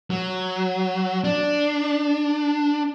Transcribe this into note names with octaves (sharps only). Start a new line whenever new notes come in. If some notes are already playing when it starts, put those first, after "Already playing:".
F#3
D4